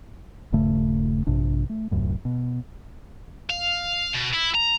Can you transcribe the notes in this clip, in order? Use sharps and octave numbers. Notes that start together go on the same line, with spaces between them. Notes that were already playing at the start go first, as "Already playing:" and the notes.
D#1 G2 C#3 A3
A#1 G2 C3 D4
A3
D#1 C2 F#2 A2
B2
F5
B2
E4
A#5